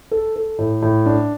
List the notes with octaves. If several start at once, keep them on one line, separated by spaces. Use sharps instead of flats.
A4
A4
A2
A2
D4